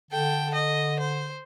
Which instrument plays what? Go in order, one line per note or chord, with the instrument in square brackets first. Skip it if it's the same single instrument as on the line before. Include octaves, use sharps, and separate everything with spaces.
[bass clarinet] D3 [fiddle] A4 G5
[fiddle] D#5
C5